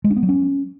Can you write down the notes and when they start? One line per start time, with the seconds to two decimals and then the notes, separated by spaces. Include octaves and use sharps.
0.04 G#3
0.10 D4
0.17 B3
0.23 F#3
0.29 C#4